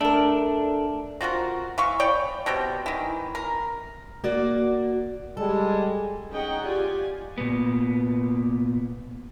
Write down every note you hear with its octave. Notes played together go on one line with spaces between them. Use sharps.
A3 D4 A#4
C4 F4 F#4 A#4
E3 F5 C#6
C#5 D5 G5
B2 C4 G4 C5
D#3 E3
A#4
A#3 F#4 D5
G3 G#3 A4
C#4 D#4 G#4 D#5 F#5 G5
F4 G4 D5 G#5
A#2 B3